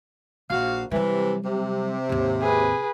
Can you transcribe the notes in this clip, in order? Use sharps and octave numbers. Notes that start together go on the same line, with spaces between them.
A#1 F#4 F5
C3 E3 F#3 G3
C3
D#2 G#2
G#4 B4